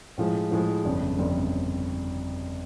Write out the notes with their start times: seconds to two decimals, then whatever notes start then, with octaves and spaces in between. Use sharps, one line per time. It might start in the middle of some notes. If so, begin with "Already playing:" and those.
0.18 A2 F3 G#3
0.51 A2 F3 G#3
0.84 G1 F2 C#3
1.17 G1 F2 C#3